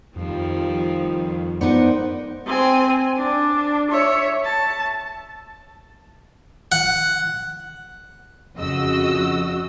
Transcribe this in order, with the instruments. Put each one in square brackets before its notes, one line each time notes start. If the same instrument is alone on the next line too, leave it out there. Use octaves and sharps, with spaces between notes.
[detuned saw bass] F2 [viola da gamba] D#3 F3 G3
[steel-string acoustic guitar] B3 D#4 A#4 [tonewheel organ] C5 D5 F#5
[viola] C4 G#5
D4
C#5 E5
A5
[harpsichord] F#5
[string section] F2 C#3 F#4 D#5 E6